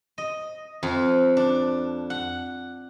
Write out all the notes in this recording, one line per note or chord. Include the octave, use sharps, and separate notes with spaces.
D#5
F2
D4
F#5